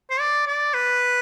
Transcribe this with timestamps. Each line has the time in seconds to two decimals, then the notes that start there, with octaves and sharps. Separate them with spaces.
0.10 C5
0.20 D5
0.47 D5
0.74 B4